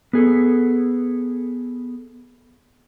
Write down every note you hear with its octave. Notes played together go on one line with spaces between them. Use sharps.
B3 G#4 A4